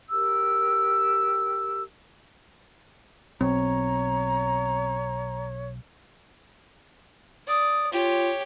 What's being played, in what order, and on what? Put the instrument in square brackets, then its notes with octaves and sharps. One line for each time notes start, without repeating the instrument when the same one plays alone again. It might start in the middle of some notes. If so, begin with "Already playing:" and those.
[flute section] G4 A#4 E6
[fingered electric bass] B1 [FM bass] C4 [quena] C#5 [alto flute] A#5
[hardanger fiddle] D5 [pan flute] D#6
[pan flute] F4 [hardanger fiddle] G4 C#5